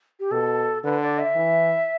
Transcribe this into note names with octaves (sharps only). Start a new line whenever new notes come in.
G4
B2 A4
D3 B4
D5
E5
E3